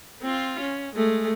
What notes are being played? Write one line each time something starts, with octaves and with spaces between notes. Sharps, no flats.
C4 F4
C#4
G#3 A3